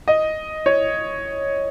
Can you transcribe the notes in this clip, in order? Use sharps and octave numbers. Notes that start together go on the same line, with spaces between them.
D#5
C#5